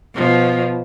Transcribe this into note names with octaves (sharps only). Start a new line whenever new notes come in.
B2 F3